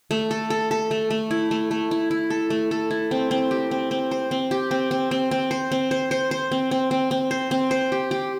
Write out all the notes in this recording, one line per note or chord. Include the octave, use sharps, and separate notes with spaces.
A3
A4
A4
A4
A3
A3
E4
A3
A3
E4
E4
A4
A3
A4
E4
C4
C4
G4
C4
C4
C5
C4
G4
C4
C4
C4
C4
C5
C4
C5
C5
C5
C4
C4
C4
C4
C5
C4
C5
G4
G4